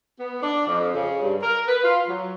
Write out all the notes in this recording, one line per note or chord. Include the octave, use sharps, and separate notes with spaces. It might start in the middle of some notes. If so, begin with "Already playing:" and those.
B3
D4
F2
C#3
G2
A#4
B4
F4
F#3